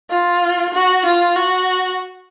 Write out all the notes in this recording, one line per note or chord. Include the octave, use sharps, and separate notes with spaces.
F4
F#4
F4
F#4